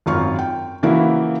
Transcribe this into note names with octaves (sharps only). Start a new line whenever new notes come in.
G#1 F#2 F4 C#6 F6
G5
C#3 E3 F3 A#3 E4 F#4